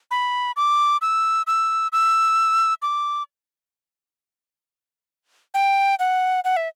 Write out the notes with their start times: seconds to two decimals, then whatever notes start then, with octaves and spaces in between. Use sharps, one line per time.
0.11 B5
0.56 D6
1.02 E6
1.47 E6
1.92 E6
2.82 D6
5.54 G5
5.99 F#5
6.44 F#5
6.57 E5